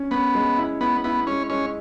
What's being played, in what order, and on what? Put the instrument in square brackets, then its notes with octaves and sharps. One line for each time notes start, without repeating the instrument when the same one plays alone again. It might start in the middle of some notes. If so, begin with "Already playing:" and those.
Already playing: [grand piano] C#4
[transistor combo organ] B3 [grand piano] C#4
[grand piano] G#3
E4
[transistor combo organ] B3 [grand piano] E4
[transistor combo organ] B3 [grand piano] E4
[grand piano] G#3 [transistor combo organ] C#4
[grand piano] G#3 [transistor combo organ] C#4